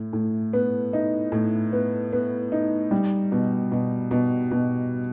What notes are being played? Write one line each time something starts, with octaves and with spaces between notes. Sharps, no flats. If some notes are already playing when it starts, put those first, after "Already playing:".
Already playing: A2
A2
B3
D#4
A2
B3
B3
D#4
G3
B2
B2
B2
B2